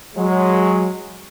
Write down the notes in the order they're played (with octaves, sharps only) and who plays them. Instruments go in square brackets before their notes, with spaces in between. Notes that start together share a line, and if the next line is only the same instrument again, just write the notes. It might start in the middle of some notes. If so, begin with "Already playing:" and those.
[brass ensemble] F#3 G#3